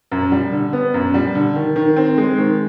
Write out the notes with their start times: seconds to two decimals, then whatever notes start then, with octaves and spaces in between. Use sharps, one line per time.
0.12 F#2
0.32 G3
0.52 D3
0.73 B3
0.94 F#2
1.14 G3
1.35 D3
1.56 D#3
1.76 D#3
1.96 C4
2.18 G#3
2.38 D#3